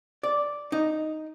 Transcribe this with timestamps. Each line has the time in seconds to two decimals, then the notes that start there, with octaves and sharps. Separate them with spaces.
0.23 D5
0.72 D#4